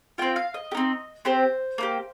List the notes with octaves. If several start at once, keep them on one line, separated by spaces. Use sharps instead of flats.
C4 F4 G5
F5
D#5
G4
C4 D#4
C4 G4 C5
A#3 D#4 G4